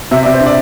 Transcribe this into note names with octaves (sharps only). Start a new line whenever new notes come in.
C3 E5
C3 D5
C5
D4
D5